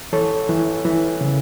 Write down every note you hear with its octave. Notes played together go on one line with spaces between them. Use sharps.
E3 A4 C#5
E3
E3
C#3